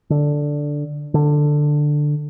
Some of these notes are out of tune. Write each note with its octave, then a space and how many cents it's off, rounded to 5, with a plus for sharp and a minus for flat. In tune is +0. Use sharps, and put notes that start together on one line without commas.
D3 +0
D3 +10